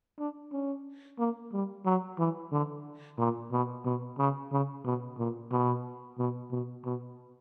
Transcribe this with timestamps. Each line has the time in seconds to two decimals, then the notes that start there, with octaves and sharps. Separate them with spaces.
0.19 D4
0.52 C#4
1.19 A#3
1.53 G3
1.85 F#3
2.19 E3
2.52 D3
3.18 A#2
3.52 B2
3.85 B2
4.19 C#3
4.52 C#3
4.85 B2
5.18 A#2
5.52 B2
6.19 B2
6.51 B2
6.85 B2